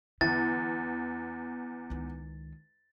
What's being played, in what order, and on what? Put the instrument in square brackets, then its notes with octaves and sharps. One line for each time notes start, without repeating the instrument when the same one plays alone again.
[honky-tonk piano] E2 [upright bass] D3 [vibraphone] B3 [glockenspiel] A6
[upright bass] C#2 D#3